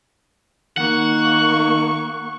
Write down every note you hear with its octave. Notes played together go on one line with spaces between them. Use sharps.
D#3 A#3 F#5 C#6